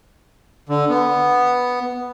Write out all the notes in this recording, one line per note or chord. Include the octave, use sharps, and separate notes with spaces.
D3
B3